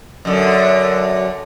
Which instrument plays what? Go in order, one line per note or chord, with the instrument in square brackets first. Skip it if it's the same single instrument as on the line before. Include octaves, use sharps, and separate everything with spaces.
[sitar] F#2 D3